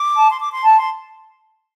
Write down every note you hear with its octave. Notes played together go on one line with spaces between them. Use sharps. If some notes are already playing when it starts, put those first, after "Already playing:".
Already playing: D6
A5
C6
D6
C6
A5
C6